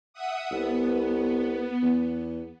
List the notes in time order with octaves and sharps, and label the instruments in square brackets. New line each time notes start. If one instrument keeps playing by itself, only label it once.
[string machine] E5 F#5 D#6
[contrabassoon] C2 [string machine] B3
[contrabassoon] E2